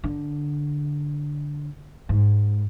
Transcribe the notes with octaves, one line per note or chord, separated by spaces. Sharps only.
D3
G#2